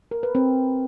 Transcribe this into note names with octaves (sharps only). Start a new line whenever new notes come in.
A#4
B4
C4